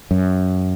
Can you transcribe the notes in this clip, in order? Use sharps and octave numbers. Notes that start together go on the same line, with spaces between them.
F#2